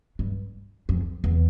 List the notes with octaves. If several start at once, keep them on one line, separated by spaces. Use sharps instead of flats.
G2
F2
E2